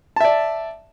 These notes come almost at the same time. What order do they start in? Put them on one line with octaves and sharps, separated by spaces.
A5 E5 D5